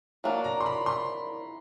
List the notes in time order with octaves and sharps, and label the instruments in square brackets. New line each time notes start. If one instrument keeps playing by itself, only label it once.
[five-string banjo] F#3 A#3 D4
[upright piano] A#5
C6
B5
C6